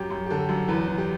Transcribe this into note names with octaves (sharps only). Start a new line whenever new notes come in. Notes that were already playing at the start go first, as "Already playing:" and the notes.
Already playing: F#2 G4
F#2
G4
D3 A4
F#2
E2 B4
E2
G4